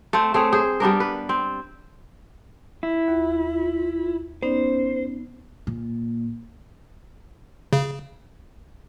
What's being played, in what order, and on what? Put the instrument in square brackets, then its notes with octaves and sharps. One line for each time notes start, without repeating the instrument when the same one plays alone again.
[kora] A3 C4
A3 C4 G#4 C#5
G#4 C5
G3 B3 D4 A#4
B4
C4
[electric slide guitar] E4
[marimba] D#2 [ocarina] F4
[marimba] B3 D#4 D5 [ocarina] C#4 [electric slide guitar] C5
[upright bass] A#2
[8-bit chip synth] C#3